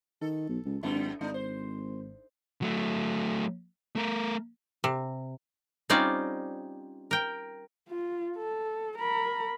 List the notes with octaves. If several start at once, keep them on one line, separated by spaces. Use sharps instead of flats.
D#3 A4
B1
C#2
G#1 F#2 D#4 E4
G#1 G#3 D4 D#4
C5
F#3 A3
A3 A#4
C3
G3 C4 C#4 D#4 F4 D5
A#4 G5
F4
A4
A#4 B5